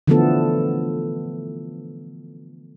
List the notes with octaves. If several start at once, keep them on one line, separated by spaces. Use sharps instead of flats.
D3 E3 F3 A3 B3 A4